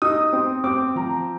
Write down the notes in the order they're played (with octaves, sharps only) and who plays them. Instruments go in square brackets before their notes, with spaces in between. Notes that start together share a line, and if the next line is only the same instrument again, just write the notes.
[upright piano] D#4 D#6
C4
C4 D6
F3 A#5